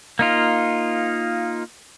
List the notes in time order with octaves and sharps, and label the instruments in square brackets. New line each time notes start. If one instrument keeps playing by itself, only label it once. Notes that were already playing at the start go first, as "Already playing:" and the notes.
[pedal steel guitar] A#3 D#4 F4